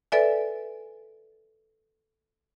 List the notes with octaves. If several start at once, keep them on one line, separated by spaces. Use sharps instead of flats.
A4 B4 D5 E5 G#5